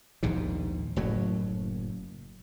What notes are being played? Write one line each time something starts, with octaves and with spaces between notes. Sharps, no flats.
A#1 D#2 G#2 B2
F#1 A2 F#3